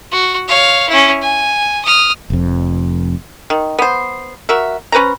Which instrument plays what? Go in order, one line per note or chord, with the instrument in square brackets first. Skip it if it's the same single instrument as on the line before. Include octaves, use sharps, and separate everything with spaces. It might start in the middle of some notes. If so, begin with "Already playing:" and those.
[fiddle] F#4
C#5 F5
C#4 E4
G#5
D#6 F6
[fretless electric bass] F1 F2
[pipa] D#3
B3 C5
F#4 A#4 E5
C#4 B4 C5 A#5